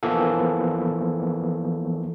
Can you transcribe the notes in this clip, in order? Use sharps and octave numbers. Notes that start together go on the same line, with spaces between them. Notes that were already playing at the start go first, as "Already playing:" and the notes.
E3 F3 A#3 B3 A4